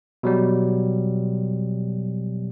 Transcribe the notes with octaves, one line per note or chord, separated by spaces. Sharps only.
B2 F#3 G3